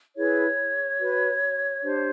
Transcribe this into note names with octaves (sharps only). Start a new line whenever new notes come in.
E4 G#4 B4 C#5
F#4 B4
D4 G4 C5